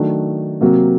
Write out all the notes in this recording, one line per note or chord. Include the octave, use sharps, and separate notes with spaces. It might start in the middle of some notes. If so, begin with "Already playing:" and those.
Already playing: D#3 F#3 A3 D4
C3 F#3 A#3 F#4